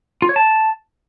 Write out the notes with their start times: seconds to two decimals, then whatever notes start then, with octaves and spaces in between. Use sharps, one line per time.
0.22 F4
0.29 C#5
0.36 A5